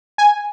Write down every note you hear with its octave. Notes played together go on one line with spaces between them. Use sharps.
G#5